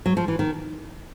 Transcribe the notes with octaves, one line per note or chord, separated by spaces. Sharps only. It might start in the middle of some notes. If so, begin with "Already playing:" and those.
F#3
F3
E3
D#3